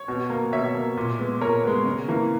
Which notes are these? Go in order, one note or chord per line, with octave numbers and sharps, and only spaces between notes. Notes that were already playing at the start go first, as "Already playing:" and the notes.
Already playing: C#5
B2
A#3
B2 C#5 E5
A#3
A#2
G#3 B3
A#2 A#4 C#5
G#3 B3
C#3
E3 A#3